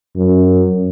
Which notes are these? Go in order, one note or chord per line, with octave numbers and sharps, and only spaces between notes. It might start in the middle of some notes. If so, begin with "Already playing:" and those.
F#2